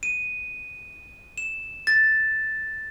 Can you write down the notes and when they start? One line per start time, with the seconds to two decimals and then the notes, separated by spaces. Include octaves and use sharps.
0.03 D#7
1.38 E7
1.87 A6